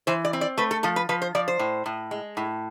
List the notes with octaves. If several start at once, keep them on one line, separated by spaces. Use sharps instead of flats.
E3 C5
D5
C4
D5
A3 B4
A4
F3 A4
B4
F3 B4
C5
F3 D5
C5
A2
A2
G#3
A2